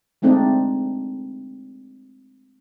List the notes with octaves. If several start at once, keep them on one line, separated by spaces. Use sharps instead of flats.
G#3 A3 C4 D4 D#4